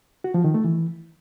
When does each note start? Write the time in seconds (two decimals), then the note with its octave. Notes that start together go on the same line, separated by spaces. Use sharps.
0.24 F#4
0.34 F3
0.44 D#3
0.54 A3
0.64 E3